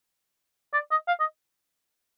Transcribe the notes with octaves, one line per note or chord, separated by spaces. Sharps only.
D5
D#5
F5
D#5